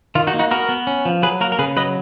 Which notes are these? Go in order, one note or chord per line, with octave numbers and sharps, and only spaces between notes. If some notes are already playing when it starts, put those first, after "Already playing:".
D#3 F4
D#4 F#4
A#3
D#4 F#4
B3 F#4 A#4
B3
C#4
F3
F#3 G#4 B4
A#3 F#4 A#4
A#4
C#3 G#4 B4
F#3 B4 D#5